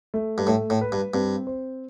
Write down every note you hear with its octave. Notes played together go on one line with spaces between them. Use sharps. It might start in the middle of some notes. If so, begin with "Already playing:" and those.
A3
G2
A2 A3
A2
B4
G2
G2 C4
C5